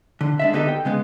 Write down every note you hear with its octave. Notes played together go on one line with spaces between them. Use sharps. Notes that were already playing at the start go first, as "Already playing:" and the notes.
D3
G#3 D4 E5
D3 B3 D#4 F#4 G4 A4
G5
C#3 G#3 B3